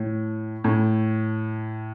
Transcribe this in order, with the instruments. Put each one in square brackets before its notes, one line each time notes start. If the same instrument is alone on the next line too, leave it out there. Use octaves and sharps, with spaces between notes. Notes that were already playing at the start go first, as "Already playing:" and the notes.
Already playing: [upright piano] A2
A2